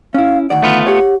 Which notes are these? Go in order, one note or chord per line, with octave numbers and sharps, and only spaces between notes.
C#4 E4 F5
D2 D#3 D5 F#5
A3 B3 F4
G4 C#5 F#5